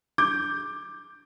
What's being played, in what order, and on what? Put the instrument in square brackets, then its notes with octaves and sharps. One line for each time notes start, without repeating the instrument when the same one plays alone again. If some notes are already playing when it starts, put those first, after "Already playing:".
[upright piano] D6 G6